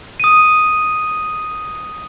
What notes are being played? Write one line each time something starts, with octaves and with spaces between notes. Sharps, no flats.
D#6 D#7